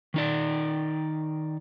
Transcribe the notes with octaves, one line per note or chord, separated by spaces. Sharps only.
D#3 D#4 D5